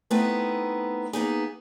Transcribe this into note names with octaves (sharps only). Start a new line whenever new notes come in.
A3 B3 C4 D#4 E4
A#3 B3 D#4 G#4